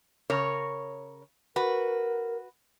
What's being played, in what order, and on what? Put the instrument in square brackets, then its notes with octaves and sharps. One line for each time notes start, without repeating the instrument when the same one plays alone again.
[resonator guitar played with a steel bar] C#3 A#4 C#5
[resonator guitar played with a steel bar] F#4 B4 [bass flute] A#4